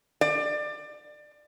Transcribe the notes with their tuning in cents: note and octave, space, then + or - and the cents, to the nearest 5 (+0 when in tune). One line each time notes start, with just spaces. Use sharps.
D5 +25